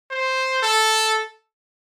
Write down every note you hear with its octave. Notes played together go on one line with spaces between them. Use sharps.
C5
A4